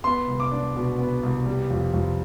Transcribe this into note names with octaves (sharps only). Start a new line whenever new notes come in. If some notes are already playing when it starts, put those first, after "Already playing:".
B3 C6
C2
D6
D4
B2
B3
C2
G3
F2
F2